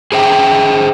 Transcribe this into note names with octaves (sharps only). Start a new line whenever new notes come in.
G#4 C5 E5 G5